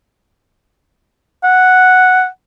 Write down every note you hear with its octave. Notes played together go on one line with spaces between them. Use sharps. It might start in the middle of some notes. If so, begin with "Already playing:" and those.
F#5